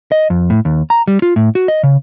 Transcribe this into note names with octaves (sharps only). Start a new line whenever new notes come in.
D#5
F2
A2
D#2
A#5
G3
F4
A2
F#4
D#5
C#3